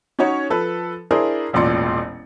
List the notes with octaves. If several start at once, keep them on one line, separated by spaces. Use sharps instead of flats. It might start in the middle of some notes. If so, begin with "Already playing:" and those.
C#4 D#4 F#4 C#5
F3 A4 B4
D4 E4 G#4 A#4 C5
E1 A1 A#2 D5 C6 C#7